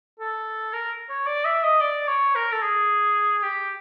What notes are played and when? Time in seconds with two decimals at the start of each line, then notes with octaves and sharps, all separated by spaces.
0.20 A4
0.73 A#4
1.10 C#5
1.27 D5
1.45 E5
1.64 D#5
1.81 D5
2.08 C#5
2.35 A#4
2.52 A4
2.63 G#4
3.43 G4